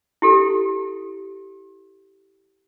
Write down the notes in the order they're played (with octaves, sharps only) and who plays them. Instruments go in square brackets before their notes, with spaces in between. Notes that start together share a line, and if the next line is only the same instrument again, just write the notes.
[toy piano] E4 G4 A4